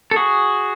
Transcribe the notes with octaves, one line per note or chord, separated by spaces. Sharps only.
A4
F#4 G#4